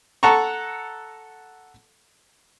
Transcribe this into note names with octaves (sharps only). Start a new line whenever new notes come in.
A4 F#5 A5 A#5 C#6